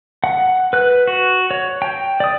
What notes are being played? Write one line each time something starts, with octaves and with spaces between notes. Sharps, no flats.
F#5
B4 F#6
F#4
C#5
G5
D5 D#6